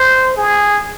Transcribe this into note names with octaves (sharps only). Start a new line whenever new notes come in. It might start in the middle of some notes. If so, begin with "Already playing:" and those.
Already playing: C5
G#4